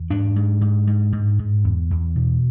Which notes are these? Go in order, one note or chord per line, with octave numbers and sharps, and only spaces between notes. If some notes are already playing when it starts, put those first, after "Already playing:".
Already playing: E2
G#2 D4
G#2
G#2
G#2
G#2
G#2
E2
E2
B2